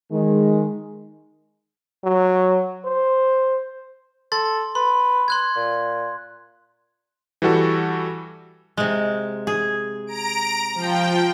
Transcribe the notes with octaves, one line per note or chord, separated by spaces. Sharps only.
D#3 G#3
F#3
C5
A4 C6 A6
B4 C6
C6 F#6 G#6
A#2
E3 G3 F#4 A4
C3 G#3
G#4
A#5 D7
F3 G5